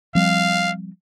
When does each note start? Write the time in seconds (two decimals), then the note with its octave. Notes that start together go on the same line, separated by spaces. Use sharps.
0.15 F3 G3 C4 F5